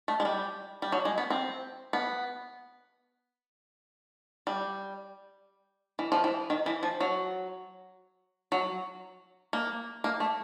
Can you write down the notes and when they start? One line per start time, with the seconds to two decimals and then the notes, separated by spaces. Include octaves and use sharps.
0.08 A3
0.20 G#3
0.25 G3
0.82 G3
0.92 F#3
1.05 G#3
1.18 B3
1.30 C4
1.93 B3
4.47 G3
5.99 E3
6.12 F3
6.24 E3
6.50 D#3
6.66 E3
6.83 F3
7.00 F#3
8.52 F#3
9.53 A#3
10.04 A#3
10.20 A3